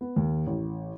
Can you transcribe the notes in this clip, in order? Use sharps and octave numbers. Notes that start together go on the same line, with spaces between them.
B3
D#2
A1